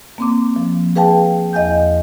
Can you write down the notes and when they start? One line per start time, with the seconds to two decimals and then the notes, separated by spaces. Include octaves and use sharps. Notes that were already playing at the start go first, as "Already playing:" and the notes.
0.18 A#3 C4 D6
0.56 F3
0.96 G#4 B4 F5 G5 A5
1.53 E2 D#5 F5 G#5 G6